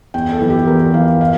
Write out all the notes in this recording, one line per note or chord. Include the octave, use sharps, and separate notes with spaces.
E2 G5
A4
E3
G4
E2 A#4
E3 F5
F5